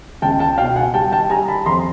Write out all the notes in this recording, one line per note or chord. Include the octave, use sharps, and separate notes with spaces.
C#2 G5 A5
G5 A5
B2 F5 G5
F#5 G#5
G3 G5 A5
G5 A5
G3 G#5 A#5
A5 B5
F2 A#5 C6